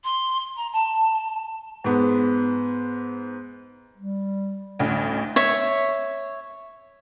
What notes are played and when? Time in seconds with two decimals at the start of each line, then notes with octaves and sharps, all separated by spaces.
0.03 C6
0.56 A#5
0.72 A5
1.84 G#2 B3
3.97 G3
4.79 A1 D2
5.36 C#5 E5